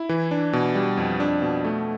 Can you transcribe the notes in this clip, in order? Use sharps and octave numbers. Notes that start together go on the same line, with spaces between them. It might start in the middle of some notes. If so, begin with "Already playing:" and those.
Already playing: E4
E3
D4
B2
G3
F2
D4
B2
A3